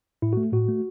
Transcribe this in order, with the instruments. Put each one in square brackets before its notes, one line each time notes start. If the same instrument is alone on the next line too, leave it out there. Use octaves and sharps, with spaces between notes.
[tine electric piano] A2 E4
F#4
A3
A2 F#4
A3